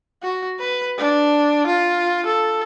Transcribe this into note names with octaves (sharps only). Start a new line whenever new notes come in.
F#4
B4
D4
F4
A4